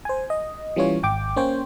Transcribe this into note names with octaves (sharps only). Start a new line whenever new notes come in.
C5 G#5
D#5
E3 G3 C#4 F4 C#5
G#1 G5 D6
A#3 C#4 C5 C#5 G5